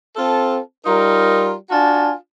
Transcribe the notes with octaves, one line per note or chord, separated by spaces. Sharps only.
C4 F4 A4
G3 D#4 F4 A#4
D4 F4 F#4 G#5 A5